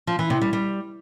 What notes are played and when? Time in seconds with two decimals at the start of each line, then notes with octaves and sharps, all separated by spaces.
0.07 F3
0.19 E3
0.30 C3
0.41 G3
0.53 G3